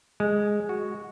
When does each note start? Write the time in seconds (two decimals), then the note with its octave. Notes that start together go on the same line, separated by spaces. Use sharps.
0.20 G#3
0.69 F#4